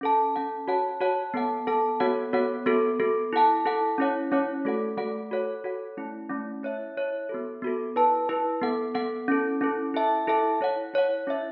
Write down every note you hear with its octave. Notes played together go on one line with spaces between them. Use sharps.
C#4 A4 F#5 A5
C#4 A4 F#5 A5
F#4 C#5 F#5 A5
F#4 C#5 F#5 A5
B3 A4 F#5 A5
B3 A4 F#5 A5
B3 F#4 A4 C#5 F#5
B3 F#4 A4 C#5 F#5
B3 F#4 A4
B3 F#4 A4
E4 A4 F#5 A5
E4 A4 F#5 A5
C#4 E4 C#5 F#5
C#4 E4 C#5 F#5
A3 F#4 A4 F#5
A3 F#4 A4 F#5
F#4 A4 C#5 F#5
F#4 A4 C#5 F#5
A3 C#4 E4
A3 C#4 E4
E4 C#5 E5
E4 C#5 E5
B3 F#4 A4
B3 F#4 A4
E4 B4 A5
E4 B4 A5
B3 A4 F#5
B3 A4 F#5
C#4 E4 A4
C#4 E4 A4
E4 A4 E5 A5
E4 A4 E5 A5
E4 C#5 F#5
E4 C#5 F#5
C#4 E4 C#5 E5